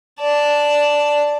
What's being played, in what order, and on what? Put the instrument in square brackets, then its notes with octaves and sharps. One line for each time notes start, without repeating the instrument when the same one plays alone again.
[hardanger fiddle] D5 A5